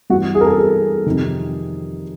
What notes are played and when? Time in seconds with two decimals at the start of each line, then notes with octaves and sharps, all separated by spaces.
0.10 G2 F#4
0.13 E3
0.35 G#4
0.41 A#4
0.46 A4
0.58 G#4
1.06 F2 C3 D#3